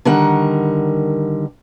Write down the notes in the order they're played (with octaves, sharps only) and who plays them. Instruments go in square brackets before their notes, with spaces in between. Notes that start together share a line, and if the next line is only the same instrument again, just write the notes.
[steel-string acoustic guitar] D3 D#3 G3 A#4 F#5